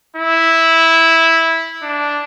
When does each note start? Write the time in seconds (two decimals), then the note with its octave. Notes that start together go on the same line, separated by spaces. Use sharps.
0.16 E4
1.83 D4